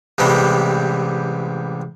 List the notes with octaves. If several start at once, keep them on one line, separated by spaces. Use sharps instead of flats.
A1 C3 E3 G3 G#3